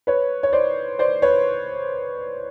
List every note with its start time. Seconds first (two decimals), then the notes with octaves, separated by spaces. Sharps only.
0.07 B4 C#5
0.43 C#5
0.53 C5 D5
0.99 C5 D5
1.22 B4 C#5